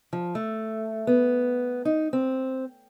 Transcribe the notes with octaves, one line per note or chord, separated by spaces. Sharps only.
F3
A3
B3
D#4
C4